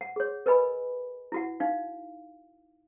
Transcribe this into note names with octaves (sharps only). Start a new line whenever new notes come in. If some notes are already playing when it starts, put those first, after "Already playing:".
F#5
G#4 C#5
A#4 B4 D#5 G#5 B5
E4 F#4 F#5
D#4 F5